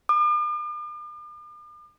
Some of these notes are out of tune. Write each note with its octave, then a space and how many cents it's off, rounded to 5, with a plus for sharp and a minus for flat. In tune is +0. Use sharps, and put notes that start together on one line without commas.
D6 +45